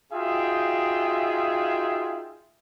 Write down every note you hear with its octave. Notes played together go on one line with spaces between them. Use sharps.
D#4 F4 F#4 G#4 E5 G5